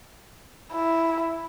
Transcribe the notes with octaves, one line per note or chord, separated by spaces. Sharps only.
E4